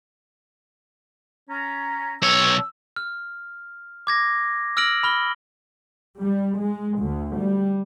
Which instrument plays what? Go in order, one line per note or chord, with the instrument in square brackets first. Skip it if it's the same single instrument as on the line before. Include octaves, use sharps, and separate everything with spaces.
[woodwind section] C#4 A#5
[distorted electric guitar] B1 C#5 [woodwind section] E6
[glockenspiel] F6
D6 G#6 A#6
E6 F6 A#6 D7 F#7
B5 F6 G7
[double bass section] G3
G#3
D2
G3